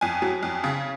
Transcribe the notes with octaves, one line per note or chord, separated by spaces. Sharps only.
F2 G#5
F#3
F2
C#3